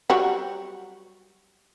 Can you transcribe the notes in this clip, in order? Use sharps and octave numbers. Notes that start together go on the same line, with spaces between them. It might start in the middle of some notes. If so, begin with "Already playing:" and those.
F#3 G3 F#4